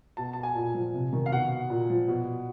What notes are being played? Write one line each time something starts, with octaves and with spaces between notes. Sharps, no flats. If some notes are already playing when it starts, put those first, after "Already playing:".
B2 A5
A5
G#5
A#2
F3
C3
D#3
F5
B2 F#5
A#2
F3
B2